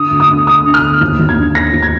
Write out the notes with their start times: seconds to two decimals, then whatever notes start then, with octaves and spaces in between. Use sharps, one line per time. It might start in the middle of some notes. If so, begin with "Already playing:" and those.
Already playing: D3 D#6
0.11 D2
0.20 D#6
0.29 D3
0.47 D3 D#6
0.64 D3
0.74 F6
0.83 D2
1.01 D#2
1.20 D#2
1.29 G#6
1.38 D3
1.55 D3 A#6
1.73 D#2
1.83 G#6